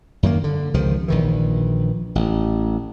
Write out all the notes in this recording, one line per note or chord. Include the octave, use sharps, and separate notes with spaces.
F#2 D#3 A#3
D3
C#2 C3 D#3 F3
A#1 D#3 E3
A1